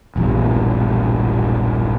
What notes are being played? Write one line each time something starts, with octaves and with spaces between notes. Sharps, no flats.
E1 A#1 E2 G2